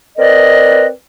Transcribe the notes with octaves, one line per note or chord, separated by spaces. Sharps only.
C4 A#4 B4 D5 D#5